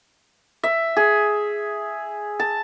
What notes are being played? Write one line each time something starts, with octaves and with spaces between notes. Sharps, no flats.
E5
G#4
A5